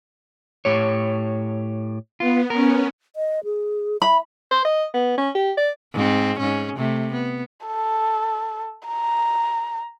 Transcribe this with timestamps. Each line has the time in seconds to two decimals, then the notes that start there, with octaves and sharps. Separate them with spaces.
0.65 A2 G4 C#5
2.20 B3 F4
2.50 B3 C#4 A#4
3.16 D#5
3.44 G#4
4.02 E5 B5
4.51 C5
4.65 D#5
4.94 B3
5.18 C#4
5.35 G4
5.58 D5
5.93 G#2 C4
6.39 G#2 C#4
6.77 C3 A3
7.13 B3
7.66 A4
8.88 A#5